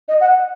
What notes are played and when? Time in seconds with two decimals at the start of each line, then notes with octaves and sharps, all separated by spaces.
0.08 D#5
0.20 F#5